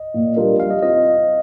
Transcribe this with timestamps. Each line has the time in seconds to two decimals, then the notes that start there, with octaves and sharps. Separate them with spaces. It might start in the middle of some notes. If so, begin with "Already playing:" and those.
Already playing: D#5
0.14 A#2
0.36 G3 D4 F4 A#4
0.59 G3 F5
0.71 D#5
0.82 C4 F4 D#5